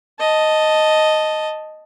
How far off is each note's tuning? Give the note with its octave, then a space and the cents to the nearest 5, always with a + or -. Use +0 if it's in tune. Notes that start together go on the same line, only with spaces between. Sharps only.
D#5 +0 A5 +0